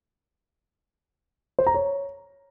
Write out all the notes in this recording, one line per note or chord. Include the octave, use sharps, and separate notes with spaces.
C5
A#5
C#5